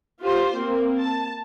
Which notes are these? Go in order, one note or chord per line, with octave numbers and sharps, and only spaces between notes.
F4 G4 C5
A#3 C4
A5